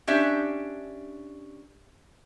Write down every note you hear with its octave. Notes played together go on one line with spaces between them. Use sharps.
C#4 D4 G4 E5